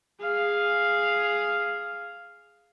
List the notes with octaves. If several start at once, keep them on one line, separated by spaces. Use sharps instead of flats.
G#4 F5